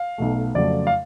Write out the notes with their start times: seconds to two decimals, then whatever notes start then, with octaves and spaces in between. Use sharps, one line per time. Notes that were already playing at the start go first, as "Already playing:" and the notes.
Already playing: F5
0.18 B1 B2 A3
0.55 F2 C#3 F#3 A3 D5
0.87 F5